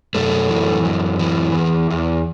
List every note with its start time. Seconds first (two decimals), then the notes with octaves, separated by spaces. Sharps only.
0.14 F#2 A3
0.50 E3
0.85 F#2
1.19 E3
1.55 E2
1.90 E2